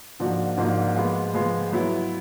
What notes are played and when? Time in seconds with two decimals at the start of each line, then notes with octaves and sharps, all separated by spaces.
0.20 G#2 F3 A#3 D4 F#4
0.57 G#2 F3 A#3 D4 F#4
0.96 F3 G#3 B3
1.34 F3 G#3 B3
1.72 F#3 B3 E4